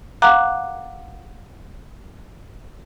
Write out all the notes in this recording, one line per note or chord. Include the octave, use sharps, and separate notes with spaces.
F5 F#5 A#5 D6 F#6